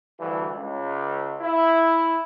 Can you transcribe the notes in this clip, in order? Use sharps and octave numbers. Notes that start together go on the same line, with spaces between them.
D2 G2 E3
C#2
E4